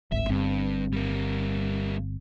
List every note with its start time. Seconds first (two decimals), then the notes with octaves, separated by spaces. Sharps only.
0.12 D1 G#1 E5
0.29 G1 G2 C4
0.93 G3 A#3